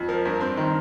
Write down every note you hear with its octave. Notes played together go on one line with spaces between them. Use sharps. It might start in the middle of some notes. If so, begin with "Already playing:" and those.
Already playing: F2
F3 A#4
G2 A#4
C4 C5
D#3 A#4